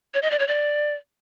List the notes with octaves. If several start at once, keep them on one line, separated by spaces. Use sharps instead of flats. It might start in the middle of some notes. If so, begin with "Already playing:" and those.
C#5
D#5
D5
C#5
D5